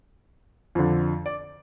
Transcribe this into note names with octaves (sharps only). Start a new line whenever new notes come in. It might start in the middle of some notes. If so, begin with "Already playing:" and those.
F2 D3
D5